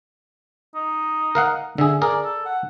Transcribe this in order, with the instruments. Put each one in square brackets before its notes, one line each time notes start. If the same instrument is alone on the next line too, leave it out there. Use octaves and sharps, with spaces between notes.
[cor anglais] D#4
[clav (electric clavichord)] A#4 F5 F#5
[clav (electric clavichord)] D3 G#4 [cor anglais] E5
[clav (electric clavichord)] G#4 A#4 [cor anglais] D5
[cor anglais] A4
F#5